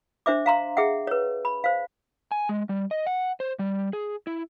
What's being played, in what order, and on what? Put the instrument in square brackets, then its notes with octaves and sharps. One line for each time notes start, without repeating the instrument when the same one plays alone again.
[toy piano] D4 C5 E5 D6
F5 A#5 C6
G#4 E5 F#5
B4 C#5
B5
C5 F5
[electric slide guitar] G#5
G#3
G3
D#5
F#5
C5
G3
G#4
E4